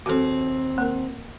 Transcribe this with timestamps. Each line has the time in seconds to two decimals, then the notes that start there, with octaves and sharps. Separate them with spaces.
0.06 D#2 C4 F#4 A4
0.78 A#3 A#4